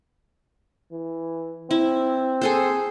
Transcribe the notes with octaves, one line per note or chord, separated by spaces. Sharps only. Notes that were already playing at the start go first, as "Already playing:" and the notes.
E3
C4 E4
G#4 A4 C5